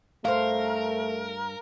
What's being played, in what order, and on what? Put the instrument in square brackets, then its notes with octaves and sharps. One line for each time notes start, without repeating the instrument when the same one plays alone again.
[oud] G2 C5 [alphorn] A3 [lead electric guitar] A#4 [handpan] F5